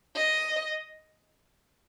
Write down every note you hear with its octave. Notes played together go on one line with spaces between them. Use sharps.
D#5